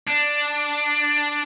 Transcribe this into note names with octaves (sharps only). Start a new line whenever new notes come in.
D4